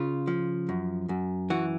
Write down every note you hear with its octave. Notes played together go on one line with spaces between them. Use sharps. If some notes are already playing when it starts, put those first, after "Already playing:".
Already playing: C#3 F4
F3
F#2
F#2
E3 F#4